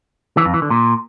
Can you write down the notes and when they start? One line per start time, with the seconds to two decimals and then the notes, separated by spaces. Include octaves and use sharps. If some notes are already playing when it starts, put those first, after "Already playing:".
0.37 E3
0.45 F2
0.54 E3
0.62 D3
0.70 A#2